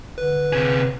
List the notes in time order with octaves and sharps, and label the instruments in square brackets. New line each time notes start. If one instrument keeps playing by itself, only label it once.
[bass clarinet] D3 [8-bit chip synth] B4
[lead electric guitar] C3 G#4